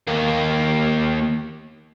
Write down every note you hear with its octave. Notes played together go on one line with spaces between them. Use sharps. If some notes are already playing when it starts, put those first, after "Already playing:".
D#2 A#3